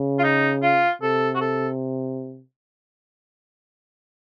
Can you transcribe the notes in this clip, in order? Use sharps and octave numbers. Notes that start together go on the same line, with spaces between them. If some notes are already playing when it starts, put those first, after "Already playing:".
Already playing: C#3
F4
D#4
F4
C3 A4
F#4
A4